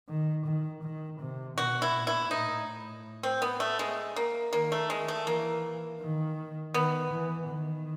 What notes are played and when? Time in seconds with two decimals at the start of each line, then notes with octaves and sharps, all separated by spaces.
0.09 D#3
0.46 D#3
0.83 D#3
1.21 C3
1.58 B2 F#4
1.82 E4
1.94 A#2
2.07 E4
2.31 A2 D#4
3.23 C4
3.42 B3
3.60 A3
3.79 G#3
4.16 A#3
4.52 D#3 A#3
4.72 A3
4.90 G#3
5.08 A3
5.26 E3 A#3
6.01 D#3
6.74 D#3 B3
7.12 E3
7.49 D#3